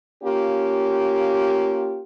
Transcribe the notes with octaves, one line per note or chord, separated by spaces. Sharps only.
A#3 C#4 F4 G4